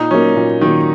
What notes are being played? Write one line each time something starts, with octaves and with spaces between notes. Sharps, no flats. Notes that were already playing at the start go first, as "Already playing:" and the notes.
Already playing: A#2 D#4
F#3 A#3 C#4
A#2
D#3 F#3 A#3